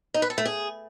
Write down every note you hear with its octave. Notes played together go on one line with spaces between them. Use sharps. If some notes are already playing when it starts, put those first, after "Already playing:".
D#4
B4
A4
A3
G#4